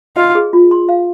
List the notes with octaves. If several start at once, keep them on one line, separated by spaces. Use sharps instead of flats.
F4 D#5
G#4
F4
C6
F5